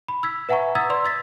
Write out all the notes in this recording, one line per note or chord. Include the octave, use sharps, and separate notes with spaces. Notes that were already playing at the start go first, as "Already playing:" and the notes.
B5
E6 G#6 B6
B4 E5 F#5 G#5 A#5 C#6
A#5 D#6 E6 G#6 A6 B6
B4 D5 C6 E6
E6 A6 B6